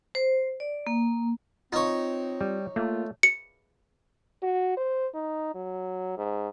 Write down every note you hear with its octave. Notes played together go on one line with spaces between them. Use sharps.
C5
D5
A#3
C4 D#4 F4 C#5
G3
A3 A#3 F4
C#7
F#4
C5
D#4
F#3
G#2